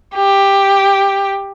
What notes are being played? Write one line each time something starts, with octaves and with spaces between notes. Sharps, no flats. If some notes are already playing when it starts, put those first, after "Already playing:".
G4